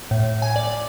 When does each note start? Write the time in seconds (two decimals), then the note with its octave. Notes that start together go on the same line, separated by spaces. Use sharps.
0.11 A2
0.42 G#5
0.56 D5